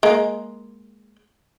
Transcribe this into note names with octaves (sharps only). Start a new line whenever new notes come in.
G#3 A#3